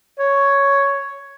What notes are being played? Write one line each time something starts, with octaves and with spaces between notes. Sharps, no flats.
C#5